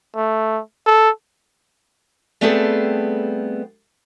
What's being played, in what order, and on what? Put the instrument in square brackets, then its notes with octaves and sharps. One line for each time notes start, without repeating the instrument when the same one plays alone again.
[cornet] A3
A4
[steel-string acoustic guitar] G3 A3 B3 C4 G#4 A4